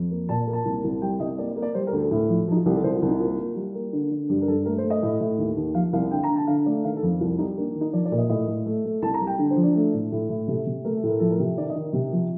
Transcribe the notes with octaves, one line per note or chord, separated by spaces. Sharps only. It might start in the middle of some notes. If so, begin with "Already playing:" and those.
Already playing: F2
A#3
A#2 A5
A#3
A5
C2
C2
G3 G5
C2 D#5
A#3 D5
D5
A#3
D5
G3 C5
A#4
D2
A4
A2
F3
F3 D#4
F4
C2 G4
A4
C2 C5
F4
C2
D#4
A#3 F4
A#3
G3
A#3
D3
D3
G2 G4
A#4
G2 A4
A3 A#4
C5
A3
D#5
A2
A2
D#2
D#2
F3 F5
C2 F5
D3 G5
A#5
D3
A5
D3 F5
A3 D5
D#3 F5
A4
F2
C2 F4
G3 D#4
A#3 D4
D#3
D#4
F3 D5
D5
A#2
D#5
A2 D#5
A2
A3
A3
C2 A5
A#5
G3
G5
D3
C5
F3
D4
A3
A2
A2
A2
C3 A4
C3
A3 A#4
A4
A2
A#4
F3 A4
A#4
C3
D#3 D5
D#5
D#3
C3
F3